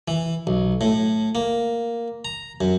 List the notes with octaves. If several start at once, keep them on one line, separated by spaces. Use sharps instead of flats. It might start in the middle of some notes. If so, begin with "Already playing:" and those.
E3
B1
A2
A#3
A#5
F#2